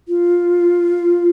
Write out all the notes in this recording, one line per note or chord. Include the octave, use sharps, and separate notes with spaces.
F4